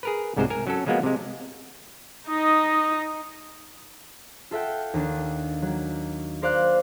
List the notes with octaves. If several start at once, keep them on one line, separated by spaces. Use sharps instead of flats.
G#4 A#4 B4
C2 G#2 C3 G#3 C5
A#4 G#5
F#3 C#4 A4
F3 F#3 G#3 A#3 B3
C3 G#3
D#4 D#5
F4 A4 E5 F#5 G5
D#2 D#3 D4
F#3 A#3
A#4 C5 D5 F5 D6 F#6